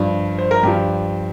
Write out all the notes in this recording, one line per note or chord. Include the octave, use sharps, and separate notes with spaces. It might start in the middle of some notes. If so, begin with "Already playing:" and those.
Already playing: G2 F3
C5
A#4
G2 F3 G4